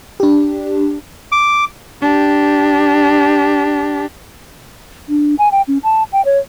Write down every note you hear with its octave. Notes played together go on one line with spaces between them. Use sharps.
D4 G4
D6
D4 G4
D4
G#5
G5
C#4
A5
G5
C#5